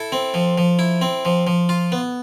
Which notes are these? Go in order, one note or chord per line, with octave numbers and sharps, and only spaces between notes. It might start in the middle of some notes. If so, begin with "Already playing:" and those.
Already playing: E4 A4
C4
F3
F3
E4
C4
F3
F3
F4
B3